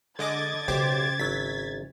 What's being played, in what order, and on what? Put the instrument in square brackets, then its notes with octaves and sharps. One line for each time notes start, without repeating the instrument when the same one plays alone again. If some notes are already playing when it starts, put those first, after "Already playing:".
[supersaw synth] D3 D#5 D6 [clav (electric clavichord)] G#3 G#5 [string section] G#6 A6
[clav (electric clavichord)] B1 [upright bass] C#3 C#4 [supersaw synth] G4 C5 D6
[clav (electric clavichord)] G#1 F#3 E4 [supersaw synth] B6